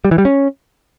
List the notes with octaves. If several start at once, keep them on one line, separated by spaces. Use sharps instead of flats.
G3
E3
G3
C#4